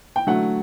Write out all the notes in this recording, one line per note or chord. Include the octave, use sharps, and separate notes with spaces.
G5
D3 F#3 A3 F#5